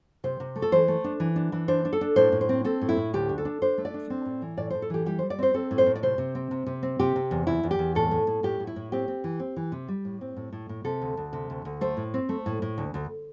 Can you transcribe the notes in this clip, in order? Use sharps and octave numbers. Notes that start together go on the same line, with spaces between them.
C3 C5
C3
A3
A4
E3 C5
A3
D4
E3
D4
E3
D4 C5
D4
A4
D4
A2 C5
A2
C5
C4
C4 A4
A2
E4
A2
D2 G4
D4
A4
D4
D4 C5
A3
D5
D4
C4
A2
E3
A2 D5
A2 C5
A4
E3 G4
G3 G4
G3 C5
D5
C4 C5
C4 A4
A2
C5
A2
D5
C3 C5
C3
C4
C3
C3
C4
C3 G4
C3
E2
E2 E4
E2
G4
E2
A2 A4
A2
A2
A2 G4
A2
E4
A2
C4 G4
C4
E3
C4
E3
C3
G3
A2
C4
A2
A2
A2
C3 A4
D2
D2
C3
D2
D2
A3 C5
A2
C4
A3
A2
A2
D2
D2